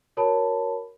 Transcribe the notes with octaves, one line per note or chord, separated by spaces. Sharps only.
F#4 A#4 C#5 A5 B5